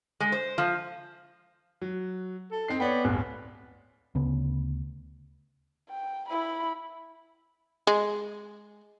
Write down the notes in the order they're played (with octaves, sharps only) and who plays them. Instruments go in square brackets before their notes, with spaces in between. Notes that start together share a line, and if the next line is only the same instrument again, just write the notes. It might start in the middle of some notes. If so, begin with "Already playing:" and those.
[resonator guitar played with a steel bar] G#3
C5
F3
[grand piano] F#3
[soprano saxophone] A4
[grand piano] C4 D#4 C7
[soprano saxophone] B3 [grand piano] C#5 D5 G5
[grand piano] D1 G1
[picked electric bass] D2 C#3 B3
[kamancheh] G5
E4 B5
[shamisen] G#3